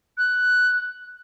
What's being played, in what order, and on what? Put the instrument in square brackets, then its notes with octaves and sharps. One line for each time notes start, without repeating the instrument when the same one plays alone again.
[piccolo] F#6